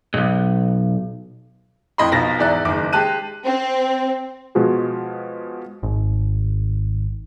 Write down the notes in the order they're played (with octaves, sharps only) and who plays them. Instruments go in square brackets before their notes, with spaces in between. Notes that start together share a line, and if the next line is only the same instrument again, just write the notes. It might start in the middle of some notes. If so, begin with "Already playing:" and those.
[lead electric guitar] B1 G#2
[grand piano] F2 A2 D#5 B5 C6
B1 B2 F3 A6 A#6
E2 G#2 D5 E5 F#6
F#1 D#3 D6
G#3 G4 A5 F#6 D#7
[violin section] C4
[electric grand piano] B2 F3 G#3 F4 F#4 G#4
[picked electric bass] G#1